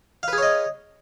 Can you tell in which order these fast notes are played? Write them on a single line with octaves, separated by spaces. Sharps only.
F5 B4 G#4 C#5 D#5